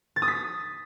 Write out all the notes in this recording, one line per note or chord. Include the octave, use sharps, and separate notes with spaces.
A6
D#6
B6